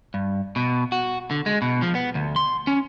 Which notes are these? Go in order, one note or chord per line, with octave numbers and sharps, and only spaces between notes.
G2
B2
F#4
D3
G#3
B2
F3
B3
D2
C6
C#4